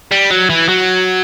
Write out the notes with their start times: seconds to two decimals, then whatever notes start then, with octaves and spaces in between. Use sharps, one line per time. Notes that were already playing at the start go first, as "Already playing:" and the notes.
0.11 G3
0.30 F#3
0.50 E3
0.69 F#3